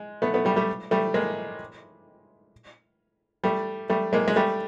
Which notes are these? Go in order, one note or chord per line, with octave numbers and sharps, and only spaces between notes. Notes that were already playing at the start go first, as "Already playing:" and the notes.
Already playing: G#3
A3 B3
A3 B3
G3 A3
G3 A3
G3 A3
G#3 A#3
G3 A3
G3 A3
G#3 A#3
G#3
G3 A3